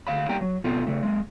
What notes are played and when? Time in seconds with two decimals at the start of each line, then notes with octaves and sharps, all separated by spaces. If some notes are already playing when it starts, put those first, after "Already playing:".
0.07 D2 F5 B5
0.29 G3 A#3 G5 A#5
0.41 F#3
0.64 B2 F3 B3 F4 A4
0.87 C#3 A3
1.03 G#3 A#3